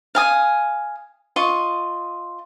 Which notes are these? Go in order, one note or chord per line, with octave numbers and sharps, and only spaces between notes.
F5 G#5 D#6
F4 D#5 C#6